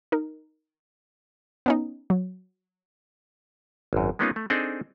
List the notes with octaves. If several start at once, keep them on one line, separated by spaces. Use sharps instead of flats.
D#4 A#4
B3 C#4 D#4
F#3
G#1 F#2
G#3 A#3 B3 C#4 D#4 F4
A3
C4 D4 D#4 G#4 A4 D#5